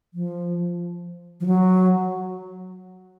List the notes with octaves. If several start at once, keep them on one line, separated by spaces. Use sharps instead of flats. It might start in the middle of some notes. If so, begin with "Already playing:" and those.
F3
F3
F#3